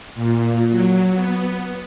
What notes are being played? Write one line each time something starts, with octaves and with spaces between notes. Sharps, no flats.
A#2
F#3
B3